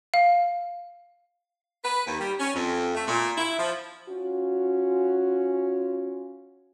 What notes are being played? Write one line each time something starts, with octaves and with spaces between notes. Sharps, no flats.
F5
B4
D#2
G3
C#4
F2
A3
A#2
E4
F3
C#4 F4 F#4